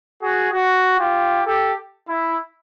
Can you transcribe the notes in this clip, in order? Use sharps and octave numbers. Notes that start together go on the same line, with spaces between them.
F#4 G#4
F#4
F4 G4
G4 A4
E4